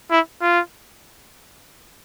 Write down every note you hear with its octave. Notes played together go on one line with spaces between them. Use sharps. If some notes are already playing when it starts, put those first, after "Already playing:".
E4
F4